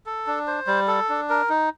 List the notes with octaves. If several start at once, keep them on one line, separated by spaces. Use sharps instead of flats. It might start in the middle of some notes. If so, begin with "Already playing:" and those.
A4
D4
C5
G3
A4
D4
A#4
D#4